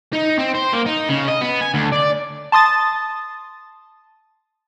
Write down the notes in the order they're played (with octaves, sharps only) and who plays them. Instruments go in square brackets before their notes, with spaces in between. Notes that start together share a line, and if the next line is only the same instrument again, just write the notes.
[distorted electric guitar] D#4
C4
C5
A#3
D#4
C#3
D#5
B3
G#5
D2
D5
[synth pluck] A5 C6 D#6 A6